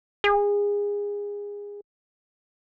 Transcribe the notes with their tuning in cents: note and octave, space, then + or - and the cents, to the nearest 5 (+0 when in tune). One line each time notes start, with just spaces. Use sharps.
G#4 -25